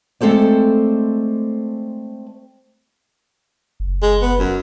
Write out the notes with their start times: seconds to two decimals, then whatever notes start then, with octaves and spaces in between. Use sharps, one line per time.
0.21 G#3 A3 C4 A4 C5 D5
3.80 F#1
4.03 G#3
4.22 B3
4.39 F#2